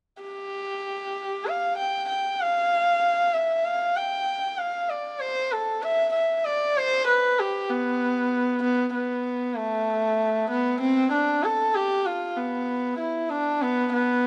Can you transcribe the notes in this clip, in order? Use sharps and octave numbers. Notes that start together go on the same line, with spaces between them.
G4
F5
G5
G5
F5
E5
F5
G5
F5
D5
C5
A4
E5
E5
D5
C5
B4
G4
B3
B3
B3
A3
B3
C4
D4
A4
G4
F4
B3
E4
D4
B3
B3